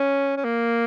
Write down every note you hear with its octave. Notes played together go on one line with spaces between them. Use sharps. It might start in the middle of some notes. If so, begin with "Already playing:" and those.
Already playing: C#4
C#4
A#3